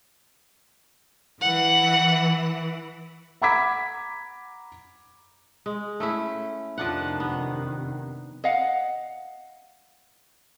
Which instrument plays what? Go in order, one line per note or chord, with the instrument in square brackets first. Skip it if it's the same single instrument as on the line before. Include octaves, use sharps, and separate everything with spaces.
[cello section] E3 [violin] F#5
[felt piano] F#5 A#5 B5 D6 G#6 B6
[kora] G#3
A3 C#4 E4
[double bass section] F2 C3 D#3 [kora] F3 D4 F#5
[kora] B3
[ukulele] D#5 F5 F#5